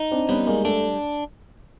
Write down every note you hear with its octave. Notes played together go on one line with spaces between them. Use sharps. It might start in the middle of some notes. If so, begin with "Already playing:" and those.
Already playing: D#4
C4 D4
G3 B3 C#4
G#3 A#3
A3 D4